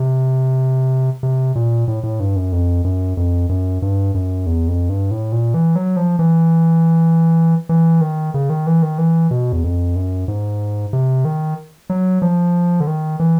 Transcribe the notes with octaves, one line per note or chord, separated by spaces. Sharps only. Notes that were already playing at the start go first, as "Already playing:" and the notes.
Already playing: C3
C3
A#2
A2
A2
G2
F#2
F2
F#2
F2
F#2
G2
F#2
E2
F2
G2
A2
A#2
E3
F#3
F3
E3
E3
D#3
C#3
D#3
E3
D#3
E3
B2
E2
F2
F#2
G#2
C3
D#3
F#3
F3
D3
D#3
E3